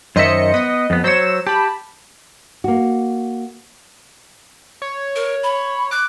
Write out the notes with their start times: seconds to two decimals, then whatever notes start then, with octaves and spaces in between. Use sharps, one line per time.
0.16 F#2 D#3 C5 D#5 E5 C#7
0.54 B3 D#5
0.90 F2 B3
1.04 F#3 C5 C#5 E6 E7
1.46 G4 A5 B5
2.64 A#3 F#4
4.82 C#5
5.16 A#4
5.43 B5
5.91 D6 F#6